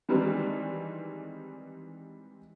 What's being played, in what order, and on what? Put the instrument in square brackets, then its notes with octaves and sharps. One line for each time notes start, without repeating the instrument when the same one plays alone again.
[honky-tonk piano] D#3 E3 G3 G#3 C4 D4